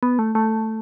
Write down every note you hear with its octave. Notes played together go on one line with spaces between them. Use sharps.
B3
A3
A3